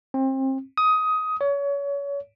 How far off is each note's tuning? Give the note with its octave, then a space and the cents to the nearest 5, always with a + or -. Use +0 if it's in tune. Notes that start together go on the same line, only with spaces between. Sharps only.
C4 +30
D#6 +15
C#5 +30